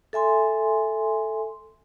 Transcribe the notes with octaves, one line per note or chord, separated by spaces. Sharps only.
A4 E5 G#5 C6